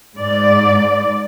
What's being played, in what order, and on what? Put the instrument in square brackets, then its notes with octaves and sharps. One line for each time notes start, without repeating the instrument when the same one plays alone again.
[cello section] G#2 D5